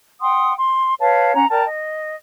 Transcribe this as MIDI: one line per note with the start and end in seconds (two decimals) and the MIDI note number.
0.21 0.54 78
0.21 0.54 79
0.21 0.54 84
0.21 0.54 87
0.58 0.94 84
1.00 1.35 71
1.00 1.35 73
1.00 1.35 77
1.00 1.35 81
1.35 1.45 61
1.35 1.45 78
1.35 1.45 82
1.50 1.63 70
1.50 1.63 74
1.50 1.63 79
1.50 1.63 81
1.65 2.17 75